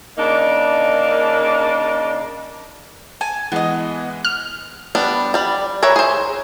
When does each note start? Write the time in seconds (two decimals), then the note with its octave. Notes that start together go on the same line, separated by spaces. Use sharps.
0.17 C#3 A#3 D4 D#4
3.21 G#5 A5
3.52 E3 G#3 B3 D#5
4.25 F6
4.95 G3 B3 D4
5.34 G3 D5
5.83 A#4 B4 C#5 E5
5.96 G#4 C5